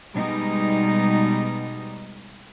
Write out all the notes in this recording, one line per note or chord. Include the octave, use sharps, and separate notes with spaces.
B2 G3 G#3 D#4